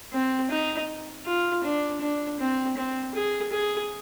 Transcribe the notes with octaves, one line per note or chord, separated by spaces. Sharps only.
C4
D#4
F4
D4
D4
C4
C4
G#4
G#4